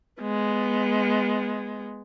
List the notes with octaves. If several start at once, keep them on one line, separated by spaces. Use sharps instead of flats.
G#3 B3